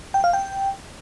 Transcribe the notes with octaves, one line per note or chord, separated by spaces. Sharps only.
G5
F5
G5